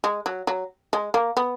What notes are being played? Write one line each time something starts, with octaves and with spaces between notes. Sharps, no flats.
G#3
F#3
F#3
G#3
A#3
B3